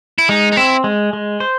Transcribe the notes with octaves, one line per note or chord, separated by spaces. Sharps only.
E4
G#3 D#4
D#4
C4 E4
G#3
G#3
C5